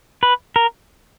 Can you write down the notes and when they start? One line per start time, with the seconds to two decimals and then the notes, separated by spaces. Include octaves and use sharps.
0.23 B4
0.56 A#4